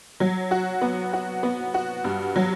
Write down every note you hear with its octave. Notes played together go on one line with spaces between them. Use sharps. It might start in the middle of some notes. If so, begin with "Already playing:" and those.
F#3
F#4
B3
F#4
B3
F#4
G2
F#3